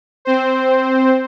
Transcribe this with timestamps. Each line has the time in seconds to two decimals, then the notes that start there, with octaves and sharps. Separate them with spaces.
0.25 C4 C5